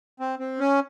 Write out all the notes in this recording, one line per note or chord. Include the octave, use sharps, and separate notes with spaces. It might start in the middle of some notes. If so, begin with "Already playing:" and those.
C4
C4
C#4